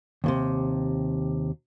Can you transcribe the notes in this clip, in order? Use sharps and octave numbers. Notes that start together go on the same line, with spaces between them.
D#2 A2 C3